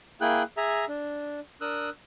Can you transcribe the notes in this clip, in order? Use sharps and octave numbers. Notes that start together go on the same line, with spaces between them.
A#3 E4 G#4 G5 F#6
G#4 E5 A#5
D4
D4 A#4 D#6 E6 F#6